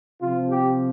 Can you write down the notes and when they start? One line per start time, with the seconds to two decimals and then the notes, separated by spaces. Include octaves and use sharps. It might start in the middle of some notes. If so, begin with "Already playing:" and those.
0.21 C3 F3 F4
0.49 G4